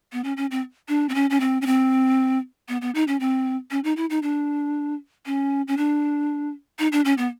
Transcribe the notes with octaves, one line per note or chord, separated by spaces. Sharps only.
B3
C#4
C#4
C4
D4
C4
C#4
C#4
C4
C#4
C4
B3
B3
D#4
C#4
C4
C#4
D#4
E4
D#4
D4
C#4
C#4
D4
D#4
D4
C#4
B3